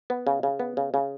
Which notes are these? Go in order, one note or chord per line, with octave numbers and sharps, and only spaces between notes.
B3
C#3
C#3
B3
C#3
C#3